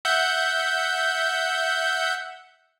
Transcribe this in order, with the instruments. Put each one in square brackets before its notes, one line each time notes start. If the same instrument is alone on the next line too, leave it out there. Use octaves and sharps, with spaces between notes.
[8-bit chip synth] E5 F#5 G6